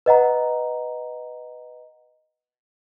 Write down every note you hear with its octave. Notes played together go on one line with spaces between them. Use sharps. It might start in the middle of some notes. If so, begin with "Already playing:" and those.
B4 D#5 F#5 A#5